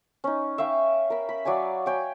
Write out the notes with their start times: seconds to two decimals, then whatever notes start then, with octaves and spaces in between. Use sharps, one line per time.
0.24 C#4 D#4
0.58 E5 F5 G5 C#6
1.10 A#4 B5
1.29 B5
1.45 F#3 D5 F5 G#5
1.86 C#5 G5 G#5